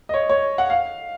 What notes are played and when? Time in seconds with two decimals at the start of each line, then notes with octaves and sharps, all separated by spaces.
0.09 D#5
0.14 C#5
0.29 C#5
0.58 F#5
0.70 F5